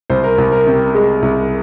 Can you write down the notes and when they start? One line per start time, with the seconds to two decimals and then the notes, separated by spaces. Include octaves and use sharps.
0.10 C2 C5
0.24 A#4
0.38 C2
0.52 A#4
0.66 C3
0.95 G#3
1.22 C2